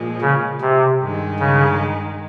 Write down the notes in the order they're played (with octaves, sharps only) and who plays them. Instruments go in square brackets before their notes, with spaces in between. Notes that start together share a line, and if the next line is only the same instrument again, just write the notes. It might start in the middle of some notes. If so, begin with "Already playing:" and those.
Already playing: [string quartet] A#2 F3 G#3
[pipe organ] C#3
C3
[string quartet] G2 D#3 G#3
[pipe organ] C#3